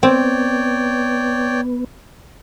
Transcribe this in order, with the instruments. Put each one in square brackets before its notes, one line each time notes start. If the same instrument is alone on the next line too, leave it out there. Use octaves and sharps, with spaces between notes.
[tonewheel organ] B3 [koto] C4 [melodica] C#5 D5 G5